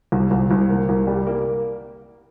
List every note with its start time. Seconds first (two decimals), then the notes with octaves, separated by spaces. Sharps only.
0.12 C2
0.31 C2
0.51 C2
0.70 A#3
0.89 C2
1.07 G3
1.27 A#3